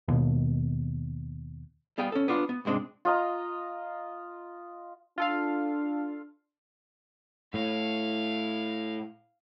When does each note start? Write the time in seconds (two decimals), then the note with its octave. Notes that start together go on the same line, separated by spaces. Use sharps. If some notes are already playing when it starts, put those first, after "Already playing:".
0.08 D#2 B2
1.98 G3 B3 G#4 F5 G5
2.12 C#4 A4
2.28 B3 D4 F4
2.49 B3
2.65 C2 G#2 G#3 C4 D4
3.05 F4 D#5 A#5
5.18 D4 F4 A4 F5
7.54 A2 F5